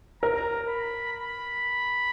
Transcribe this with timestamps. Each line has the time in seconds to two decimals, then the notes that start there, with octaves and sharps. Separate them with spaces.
0.23 A#4 A#5
0.68 B5
1.12 B5